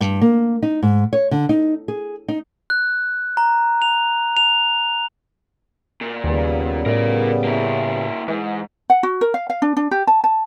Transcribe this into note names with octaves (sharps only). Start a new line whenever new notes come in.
G2
A#3
D#4
G#2
C#5
D3
D#4
G#4
D#4
F#6
A#5
F7
F7
A#2
D#2 C#3 G3 B3
A2 A#4 D5
A#3 E4
G#2 E3
F#5
F#4
A#4
F5
F5
D4
D4
G4
A5
A5